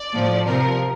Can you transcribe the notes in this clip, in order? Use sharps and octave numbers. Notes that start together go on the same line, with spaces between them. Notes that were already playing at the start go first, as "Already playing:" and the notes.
Already playing: D5
A2 F3
C3 F3 A#4